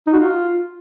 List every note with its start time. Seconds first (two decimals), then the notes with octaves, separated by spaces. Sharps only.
0.07 D#4
0.13 F#4
0.19 F4